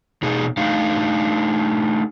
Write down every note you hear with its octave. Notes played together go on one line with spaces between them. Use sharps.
E2 B2 D#4 G#4
A3 D4 D#4 F5